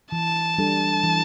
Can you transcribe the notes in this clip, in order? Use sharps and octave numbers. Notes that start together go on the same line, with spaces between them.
E3 A5
G3 D4 A4
E3